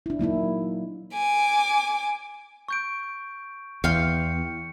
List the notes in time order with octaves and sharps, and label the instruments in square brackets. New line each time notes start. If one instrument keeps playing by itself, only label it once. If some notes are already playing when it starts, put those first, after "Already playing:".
[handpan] D4 E4
F#3 A#3 D#4 E4
[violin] G#5 D6
[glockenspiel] C#6 G6 D7
[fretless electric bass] E2 [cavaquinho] F5 G5 C6 [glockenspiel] C#7